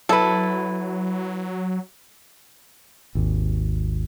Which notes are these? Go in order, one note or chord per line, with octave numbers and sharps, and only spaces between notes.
F#3 E4 A4 B4
G#1 D#2